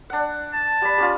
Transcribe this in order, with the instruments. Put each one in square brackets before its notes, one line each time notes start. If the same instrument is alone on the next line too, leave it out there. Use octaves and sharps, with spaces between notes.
[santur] D4 F#5
[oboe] A5
[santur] G3 B5
G3 C#4 F4